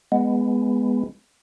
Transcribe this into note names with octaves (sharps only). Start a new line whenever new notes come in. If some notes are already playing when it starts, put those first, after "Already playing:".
G#3 B3